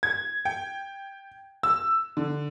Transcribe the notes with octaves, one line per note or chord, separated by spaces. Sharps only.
G#6
G5
E6
D3